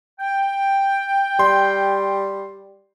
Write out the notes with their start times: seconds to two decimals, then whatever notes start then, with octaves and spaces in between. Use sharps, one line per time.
0.19 G5
1.39 G3 C6